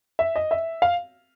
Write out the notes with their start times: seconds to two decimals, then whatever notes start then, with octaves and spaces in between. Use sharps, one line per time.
0.19 E5
0.36 D#5
0.51 E5
0.82 F5